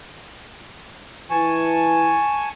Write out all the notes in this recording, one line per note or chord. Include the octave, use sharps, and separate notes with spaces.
E3 G#5 A5 C#6